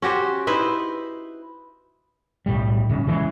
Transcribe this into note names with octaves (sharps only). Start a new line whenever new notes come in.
C#4 F#4 G4 C5
D#4 E4 B4 C5
B1 A2 G3
D#1 C#3
C#3 E3 F#3 G#3